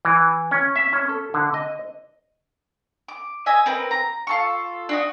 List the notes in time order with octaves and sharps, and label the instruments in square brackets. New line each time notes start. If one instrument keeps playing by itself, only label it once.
[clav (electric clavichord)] E3
C#4
E5
C#4
A4
D3
D#5
[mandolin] D6
D#5 E5 G#5
C4 A#4 B4
A#5
F4 A4 C#6
D4 F#4 D#5